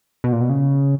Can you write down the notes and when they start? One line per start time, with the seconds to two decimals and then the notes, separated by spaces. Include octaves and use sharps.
0.24 B2
0.32 A#2
0.41 B2
0.50 C#3